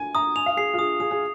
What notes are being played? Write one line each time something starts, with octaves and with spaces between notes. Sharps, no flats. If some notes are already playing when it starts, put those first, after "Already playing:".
Already playing: G#5
A#5 D#6
G#5 F7
F5
G#4 C7
F4
G#4 D#6
G#4 D#6
G#4